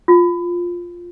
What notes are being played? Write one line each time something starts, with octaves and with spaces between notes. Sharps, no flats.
F4